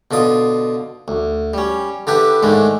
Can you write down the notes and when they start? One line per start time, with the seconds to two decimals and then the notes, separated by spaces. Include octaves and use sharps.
0.11 B2 D3 F4 D#6
1.08 D2
1.54 G3 C#4
2.07 D3 D4 E4 G4 B4
2.43 G#2 D#3 G#3 A3 D4